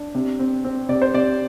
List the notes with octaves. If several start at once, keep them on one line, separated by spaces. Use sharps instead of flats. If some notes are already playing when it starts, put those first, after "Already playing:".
Already playing: D4
C3
C4
C4
C3 D5
C5
C3 D5